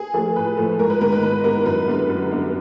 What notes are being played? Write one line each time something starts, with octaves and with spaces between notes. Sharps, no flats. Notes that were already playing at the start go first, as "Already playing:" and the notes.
Already playing: G#4
F3 A3 G#4
A2 B4
F3 A3
G#2 A#4
B4
D#3 G#3 B3 A#4
B4
G#2 B4
D#3 G#3 B3 A#4
F#2 B4
D3 G3 B3 B4
F#2
D3 G3 B3